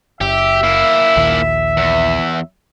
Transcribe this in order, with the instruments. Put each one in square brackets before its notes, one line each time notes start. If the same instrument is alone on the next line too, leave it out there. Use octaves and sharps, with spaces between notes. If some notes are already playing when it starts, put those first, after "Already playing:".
[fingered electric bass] F#1 [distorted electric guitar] G4 [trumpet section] E5
[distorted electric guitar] A#3 E4
[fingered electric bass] A#1 D#2
[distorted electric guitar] E2